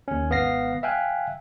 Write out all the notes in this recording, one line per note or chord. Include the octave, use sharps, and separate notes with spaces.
D#2 C#4
G#1 B3 F5 A#6 C7
E5 F5 G5 G#5 F#6